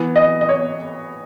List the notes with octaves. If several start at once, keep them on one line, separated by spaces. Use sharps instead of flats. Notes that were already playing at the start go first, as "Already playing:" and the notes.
Already playing: E3 B3
D#5
D#5
C#5